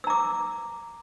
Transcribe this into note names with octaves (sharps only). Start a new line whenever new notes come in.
A#5 D6 E6